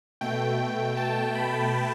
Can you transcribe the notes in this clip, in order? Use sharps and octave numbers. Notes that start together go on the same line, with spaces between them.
B2 A3 G5
A5
B5